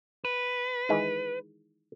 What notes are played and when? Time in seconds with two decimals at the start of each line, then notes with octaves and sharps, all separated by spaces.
0.25 B4
0.89 D#3 E3 G#3